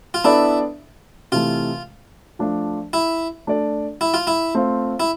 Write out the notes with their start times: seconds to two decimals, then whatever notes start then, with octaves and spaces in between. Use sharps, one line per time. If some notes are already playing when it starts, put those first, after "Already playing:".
0.14 F4
0.24 B3 D4 E4 A4 D5
1.32 C3 E3 A3 F4
2.39 F3 A3 D4 F4
2.93 E4
3.47 A3 D4 A4 D5
4.01 E4
4.14 F4
4.27 E4
4.55 A3 C4 F4
5.00 E4